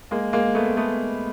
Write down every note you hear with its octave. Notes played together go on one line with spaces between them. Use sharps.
G#3 A#3
G#3 A#3
A3 B3
A3 B3